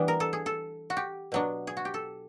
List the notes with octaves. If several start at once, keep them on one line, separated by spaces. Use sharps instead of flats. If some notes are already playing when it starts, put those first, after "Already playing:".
Already playing: E3 G3 B3 D4
A#4
A4
G#4
A4
F#4
G4
B2 F#3 B3 D4
G#4
F#4
G4
A4